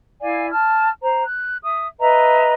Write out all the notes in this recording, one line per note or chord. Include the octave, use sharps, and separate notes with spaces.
E4 D5 F5 G#5
A5 F6
C5 A#5
F#6
E5 D#6
B4 D#5 E5 A#5